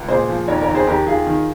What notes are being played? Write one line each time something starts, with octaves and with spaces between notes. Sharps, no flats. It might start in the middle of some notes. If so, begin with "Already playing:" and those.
Already playing: C#2
A#2 G#4 C5
F3
D#2 A#4 C#5
A#4 C#5
D#2
G#4 C5
D#2 G4 A#4
D#2 F4 G#4
D#3